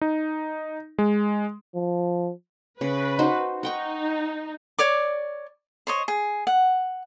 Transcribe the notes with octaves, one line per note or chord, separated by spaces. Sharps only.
D#4
G#3
F3
C#3 B4
D#4 F#4 C5
D#4 F#5 G5 C#6
C#5 D5 D6
C5 C#5 D#5
G#4
F#5